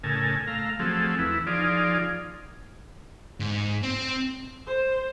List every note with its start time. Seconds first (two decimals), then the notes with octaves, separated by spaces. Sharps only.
0.04 A2 C#3 A#4 G#5 A5
0.47 A3 F5 A#5
0.79 F3 F#3 A3 C4 G#4 A4
1.19 E2 E4 B4
1.47 F3 D#4 F4 G#4 D5
3.40 G#2
3.83 C4
4.67 C5